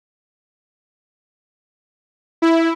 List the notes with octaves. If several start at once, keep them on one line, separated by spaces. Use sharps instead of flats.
E4